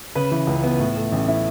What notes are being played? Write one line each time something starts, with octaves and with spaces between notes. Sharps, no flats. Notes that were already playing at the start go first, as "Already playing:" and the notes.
C#3 B4
E3
C#2
B3
A2
A3
A1
E4